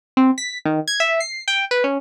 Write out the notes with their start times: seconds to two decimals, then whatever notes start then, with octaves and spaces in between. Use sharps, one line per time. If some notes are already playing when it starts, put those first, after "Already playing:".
0.17 C4
0.38 B6
0.65 D#3
0.88 G#6
1.00 E5
1.20 C7
1.48 G5
1.71 B4
1.84 C#4